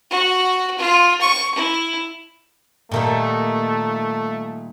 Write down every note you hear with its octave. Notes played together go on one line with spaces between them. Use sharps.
F#4
F4
C#6
E4
A#2 D#3 G3 A3